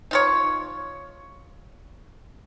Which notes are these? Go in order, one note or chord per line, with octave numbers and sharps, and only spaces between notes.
D#4 F4 C#5